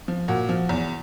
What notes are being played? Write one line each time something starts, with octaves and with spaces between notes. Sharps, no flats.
F3
A#2 F#4
F3
E2